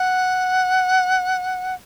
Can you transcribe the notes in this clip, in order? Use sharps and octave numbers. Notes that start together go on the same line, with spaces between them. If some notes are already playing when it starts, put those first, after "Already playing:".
Already playing: F#5